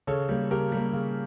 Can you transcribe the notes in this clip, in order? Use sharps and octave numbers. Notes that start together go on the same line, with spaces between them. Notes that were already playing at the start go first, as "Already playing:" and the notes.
C#3 A4 C#5
G3 A#3
C#3 G4 A#4
G3 A#3
C#3